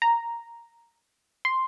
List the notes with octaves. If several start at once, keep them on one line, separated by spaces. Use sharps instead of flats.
A#5
C6